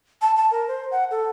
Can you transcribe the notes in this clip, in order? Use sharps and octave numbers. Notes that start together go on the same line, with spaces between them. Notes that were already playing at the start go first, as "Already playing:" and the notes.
A5
A5
A#4
C5
F#5
A4